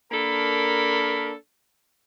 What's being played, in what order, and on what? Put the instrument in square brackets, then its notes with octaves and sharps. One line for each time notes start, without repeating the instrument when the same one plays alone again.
[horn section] A#3 D4 A4 A#4 B5